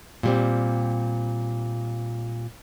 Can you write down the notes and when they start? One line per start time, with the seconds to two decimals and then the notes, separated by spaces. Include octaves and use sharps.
0.23 A#2 G3 C4